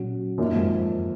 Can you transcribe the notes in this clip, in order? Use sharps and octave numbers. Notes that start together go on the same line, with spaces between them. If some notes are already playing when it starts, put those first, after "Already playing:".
Already playing: A#2 F#3 C#4 F#4
F#2 A#2 D#3 A#3 D#4
F2 G#2